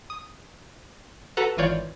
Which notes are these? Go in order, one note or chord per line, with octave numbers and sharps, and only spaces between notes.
D#6
F#4 A4 B4 A#5 F#6
G#1 E3 F4 C#5 D5 G6